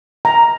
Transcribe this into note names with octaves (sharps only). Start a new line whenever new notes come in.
A#5